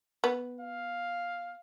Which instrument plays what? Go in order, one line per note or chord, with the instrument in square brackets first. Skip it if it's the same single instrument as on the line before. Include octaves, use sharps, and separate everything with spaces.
[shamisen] B3
[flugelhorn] F5